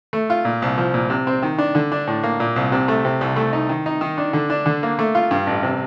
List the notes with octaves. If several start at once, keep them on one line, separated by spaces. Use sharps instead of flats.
A3
F4
A#2
C2
F3
A#2
C3
C4
D#3
D4
D3
D4
A2
A#3
A#2
C2
C3
A3
C3
C2
A3
D#4
D#3
D#4
D#3
D4
D3
D4
D3
A#3
A3
F4
G2
A1
C3